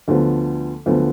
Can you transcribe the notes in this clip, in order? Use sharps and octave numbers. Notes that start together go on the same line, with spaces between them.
D2 D3 F3 B3
D2 D3 F3 B3